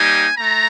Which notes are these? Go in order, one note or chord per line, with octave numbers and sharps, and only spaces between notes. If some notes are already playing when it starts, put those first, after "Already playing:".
Already playing: G3 A#3 D#4 G4 G#5
A3 A#5